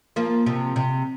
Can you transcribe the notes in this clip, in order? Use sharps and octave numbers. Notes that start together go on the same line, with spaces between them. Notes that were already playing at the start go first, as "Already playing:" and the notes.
F3 A#3
C3 F3
C3